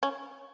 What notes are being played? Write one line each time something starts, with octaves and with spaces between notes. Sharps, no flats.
C#4